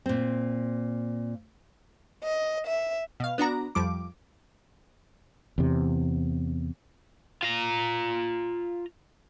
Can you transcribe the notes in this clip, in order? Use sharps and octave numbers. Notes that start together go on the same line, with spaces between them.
A#2 C4
D#5
E5
B2 F5
B3 D4 F#4 A#5
F2 F3 G3 D6
E2 C3
F4 A#5